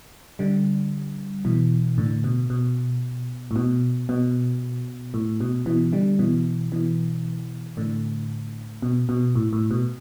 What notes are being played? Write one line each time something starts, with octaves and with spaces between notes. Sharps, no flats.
D3 G3
B2 E3
A2 D3
B2
B2
A2
B2
B2
A2
B2
B2 E3
D3 G3
B2 E3
B2 E3
A2 D3
B2
B2
A2
A2
B2